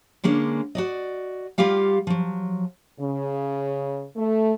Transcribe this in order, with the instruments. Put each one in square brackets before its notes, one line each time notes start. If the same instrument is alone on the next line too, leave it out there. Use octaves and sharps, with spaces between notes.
[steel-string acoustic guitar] D3 G#3 A#3 C#4 D4
F#4 D5 D#5
G3 F4 G4 F5 F#5
F3 F#3
[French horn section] C#3
A3